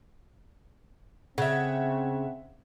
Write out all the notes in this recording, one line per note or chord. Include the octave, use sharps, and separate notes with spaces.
C#3 C4 E5 F#5